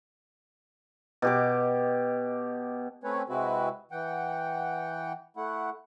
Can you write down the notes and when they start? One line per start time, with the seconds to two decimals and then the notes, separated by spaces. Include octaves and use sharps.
1.22 B2 G4 D6
3.04 A3 C4 C#4 B4 C#5
3.29 C3 G#3 C4 E4 F#4 B4
3.91 E3 F#5 G5
5.37 A3 E4 F#5